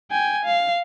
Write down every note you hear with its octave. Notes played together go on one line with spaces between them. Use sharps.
G5 G#5
F5